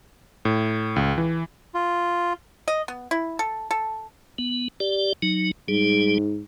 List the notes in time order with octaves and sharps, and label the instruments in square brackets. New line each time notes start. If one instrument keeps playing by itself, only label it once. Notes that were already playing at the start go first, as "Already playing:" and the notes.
[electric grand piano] A2
C#2
E3
[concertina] F4
[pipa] D#5
B3
E4
A4
A4
[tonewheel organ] B3
G4 D5
F#3 D#4
[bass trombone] G#2 [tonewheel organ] G3 G#4